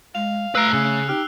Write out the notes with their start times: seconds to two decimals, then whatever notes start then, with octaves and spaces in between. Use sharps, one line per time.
0.15 G#3 F5 F7
0.55 A3 B4 A#5 E6 F#6 C7
0.73 C#3 G#4
1.09 D#4 G4 F6